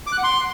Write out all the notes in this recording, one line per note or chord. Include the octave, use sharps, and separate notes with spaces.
D6
F#6
F#5
C6